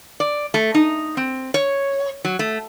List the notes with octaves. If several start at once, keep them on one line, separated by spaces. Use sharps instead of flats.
D5
A3
D#4
C4
C#5
F#3
A3